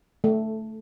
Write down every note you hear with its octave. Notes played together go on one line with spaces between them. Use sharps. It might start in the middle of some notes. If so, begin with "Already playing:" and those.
A3